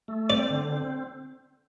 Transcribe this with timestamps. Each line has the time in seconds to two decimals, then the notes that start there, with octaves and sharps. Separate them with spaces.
0.08 A3
0.29 C4 D5
0.50 D3
0.72 C4